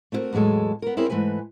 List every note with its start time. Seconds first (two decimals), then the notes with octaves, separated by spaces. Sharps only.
0.12 A3 C4 E4 F#4 A#4
0.32 E2 A2 F#3 G#3 A4
0.82 B3 A#4
0.97 C4 E4 G#4 A#4 C#5
1.09 G#2 E3 A3 B4 G#5